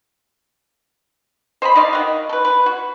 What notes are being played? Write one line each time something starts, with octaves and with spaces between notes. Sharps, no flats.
C5 D#5 A#5 B5
D#4 D5 D#5 F5
D#3 F#4
A4 B4
B4
F#4